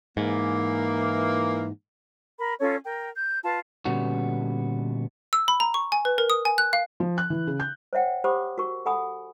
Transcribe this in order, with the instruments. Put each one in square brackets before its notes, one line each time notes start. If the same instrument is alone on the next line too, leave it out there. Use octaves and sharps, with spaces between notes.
[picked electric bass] G#2 [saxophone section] E3 A#3
[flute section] A#4 B5
C#4 F4 A4 C#5
A#4 G5
G6
F4 B4 A5
[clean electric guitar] A#2 D3 G3 B3 C#4 F#4
[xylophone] E6
B5
A#5
C#6
G#5
B4
A#4
D#6
G#5
F#6
F5
[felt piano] F3
F#6
E3
C#3
G6
[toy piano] C5 C#5 E5 F#5 G5
G4 C5 F#5 B5 D6 D#6
F#4 A#4 C#6
A4 F#5 G#5 B5 D#6